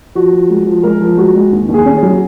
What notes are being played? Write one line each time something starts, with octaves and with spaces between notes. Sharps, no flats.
F3 F#4
F3
G#3
F3
G#3 A#4
F3
G#3 F#4
G#3
D#2
D#2
G#4
C#4
G#4
F#3